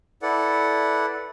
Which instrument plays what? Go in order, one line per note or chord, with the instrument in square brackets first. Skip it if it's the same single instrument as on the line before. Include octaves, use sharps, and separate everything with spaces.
[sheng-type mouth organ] E4 A4 B4 D5 F#5